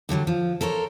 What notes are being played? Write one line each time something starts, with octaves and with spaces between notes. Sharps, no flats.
G2 D3 F#3 G3
F3
A4 A#4 C5 C#5